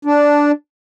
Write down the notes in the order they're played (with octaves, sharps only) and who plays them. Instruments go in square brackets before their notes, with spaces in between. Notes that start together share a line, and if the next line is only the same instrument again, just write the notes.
[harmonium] D4